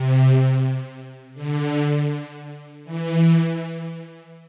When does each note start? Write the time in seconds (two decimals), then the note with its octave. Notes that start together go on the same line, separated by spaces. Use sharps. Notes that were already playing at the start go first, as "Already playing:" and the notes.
Already playing: C3
1.34 D3
2.84 E3